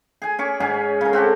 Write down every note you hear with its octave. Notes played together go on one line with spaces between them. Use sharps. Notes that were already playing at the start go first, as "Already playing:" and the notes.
G#4 G#5
C#4 C#6 D6
G#2 C#4 G#4 G#5
C#3 A#4
C4 F#4 G4 A4